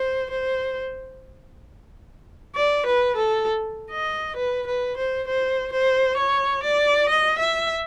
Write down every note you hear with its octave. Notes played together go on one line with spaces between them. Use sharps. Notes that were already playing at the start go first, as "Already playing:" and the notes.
Already playing: C5
C5
D5
B4
A4
D#5
B4
B4
C5
C5
C5
C#5
D5
D#5
E5